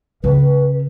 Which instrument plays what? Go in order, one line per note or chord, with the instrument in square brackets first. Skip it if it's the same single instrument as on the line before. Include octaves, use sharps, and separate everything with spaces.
[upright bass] C#3 C#4 [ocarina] B4